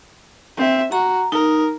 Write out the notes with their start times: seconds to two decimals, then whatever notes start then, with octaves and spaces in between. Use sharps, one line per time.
0.57 C4 E5
0.92 F#4 A#5
1.32 D#4 A#4